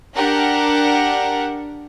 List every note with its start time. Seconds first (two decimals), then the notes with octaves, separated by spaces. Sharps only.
0.15 D4 G4 A#4 F#5